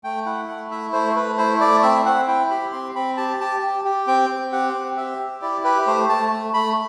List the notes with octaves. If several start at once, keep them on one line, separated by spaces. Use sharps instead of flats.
A3 G5
E4 F#5
A3 F#5
E4 E5
A3 C5
A3 B4
E4 C5
A3 D5
C4 E5
C4 F#5
E4 G5
G4 B5
C4 C6
C4 B5
G4 A5
G4 A5
G4
G4
C4 G5
C4
G4 F#5
C4
G4 E5
G4
E4 D5
G4 B4
A3 C5
A3 A5
A3
A3 B5